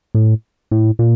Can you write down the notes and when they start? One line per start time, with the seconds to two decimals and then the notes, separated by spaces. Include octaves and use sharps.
0.15 A2
0.71 A2
0.99 A#2